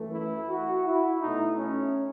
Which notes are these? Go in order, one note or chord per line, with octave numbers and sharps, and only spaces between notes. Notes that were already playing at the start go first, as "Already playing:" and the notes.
Already playing: F#2 E3 A3
E4
F#4
E4
B2 A3 D#4
C#4